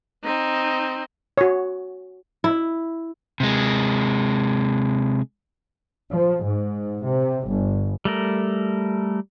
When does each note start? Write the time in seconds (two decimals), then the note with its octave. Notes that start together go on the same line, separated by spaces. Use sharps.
0.24 C4 D#4
1.37 F#4 C#5
2.44 E4
3.40 C3 G#3
6.12 F3
6.44 G#2
7.04 C3
7.47 G1
8.05 G3 A3 A#4